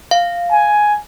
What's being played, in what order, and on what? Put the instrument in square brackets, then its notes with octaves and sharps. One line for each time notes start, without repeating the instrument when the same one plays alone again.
[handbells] F5
[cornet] G#5